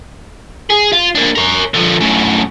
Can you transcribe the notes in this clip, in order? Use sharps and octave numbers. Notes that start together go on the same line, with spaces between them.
G#4
F4
A#3 D4
A#4 C#5
D3 F3
F#2 A2